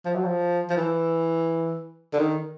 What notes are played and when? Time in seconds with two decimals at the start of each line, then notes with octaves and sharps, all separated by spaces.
0.05 F3
0.15 F#3
0.25 F3
0.70 F3
0.77 E3
2.13 D3
2.19 D#3